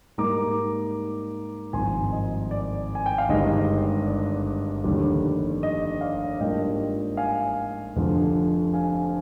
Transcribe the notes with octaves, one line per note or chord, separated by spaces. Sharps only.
G#2 G3 A#3 D#4 A#5 D6
G#1 G2 F3 G#5 C6
D#5
D5
G#5
G5
F5
G1 G2 D#3 G#3 D4 D#5
D5
F1 D#2 D3 G3
D#5
D5 F5
G#2 G3 A#3 D4 F4 D#5 G5
F5 G#5
F1 F2 D3 F3
F5 G#5